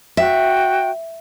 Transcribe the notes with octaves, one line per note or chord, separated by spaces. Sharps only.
F#4 E5 G5